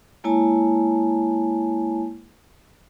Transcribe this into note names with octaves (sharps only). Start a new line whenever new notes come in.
G#3 A#3 E4 C#5 G#5 A5